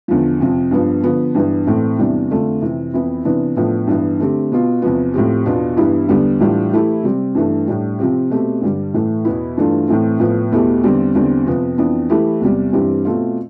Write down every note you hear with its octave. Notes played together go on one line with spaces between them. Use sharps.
E2 D3 F3
F2 C3 F3
G2 F3 B3
D3 F3 B3
G2 E3 B3
A2 E3 A3 C4
E2 C3 E3 G3 D4
F2 D3 A3 D4 F4
F2 C3 E3
F2 E3 B3 E4
C3 E3 B3 D4
A2 F3 B3 D4
G2 E3 B3
D3 A3 C4 G4
B2 B3 F4
E2 C3 F3 B3
A2 F3 C4 G4
E2 B2 B3 D4 F4
G2 E3 B3 E4 G4
E2 D3 G3 B3
A2 E3 G3 D4 F4
E3 A3 E4 G4
C3 G3 C4
G2 E3 A3
A2 G3 D4
C3 F3 C4 G4
B2 A3 C4 G4
G2 D3 G3
A2 E3 A3
E2 B2 B3 E4
G2 E3 A3 D4 F4
A2 E3 A3 C4
A2 F3 B3
E2 B2 A3 E4 G4
E2 D3 G3 C4
E2 D3 G3 C4
F2 C3 F3 B3
F2 E3 B3 D4
E3 A3 E4 G4
E2 C3 G3
G2 E3 G3 C4 G4
B2 A3 C4 F4